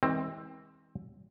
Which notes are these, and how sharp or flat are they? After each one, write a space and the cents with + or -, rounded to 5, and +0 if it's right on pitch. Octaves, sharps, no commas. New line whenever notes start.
E3 -40 G#3 -25 C4 +15